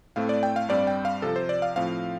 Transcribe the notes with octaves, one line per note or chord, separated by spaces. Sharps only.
A2 A3 C4 F5
D5
G5
F5
G2 G3 C4 D5
G5
F5
C3 F3 C4 A4
C5
D5
F5
A2 F3 C4 F5